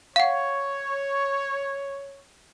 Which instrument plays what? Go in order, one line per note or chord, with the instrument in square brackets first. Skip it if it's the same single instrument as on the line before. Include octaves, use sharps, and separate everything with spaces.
[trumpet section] C#5 [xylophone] F5 F#5